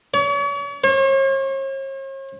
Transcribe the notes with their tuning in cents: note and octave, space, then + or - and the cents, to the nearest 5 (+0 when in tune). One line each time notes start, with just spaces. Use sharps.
C#5 +40
C#5 -45